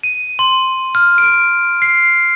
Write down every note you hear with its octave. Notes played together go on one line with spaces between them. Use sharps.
D#7
C6
F6
D7
C7